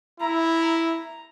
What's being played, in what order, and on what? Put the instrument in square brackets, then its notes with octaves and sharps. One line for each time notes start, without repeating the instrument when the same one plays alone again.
[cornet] E4 [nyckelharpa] A#5